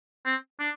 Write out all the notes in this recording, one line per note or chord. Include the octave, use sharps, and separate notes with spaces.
C4
D4